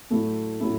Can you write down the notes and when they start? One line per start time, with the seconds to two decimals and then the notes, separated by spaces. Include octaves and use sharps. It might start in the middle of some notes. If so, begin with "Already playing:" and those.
0.10 A2 F#3 A3 E4
0.60 A2 F#3 A3 E4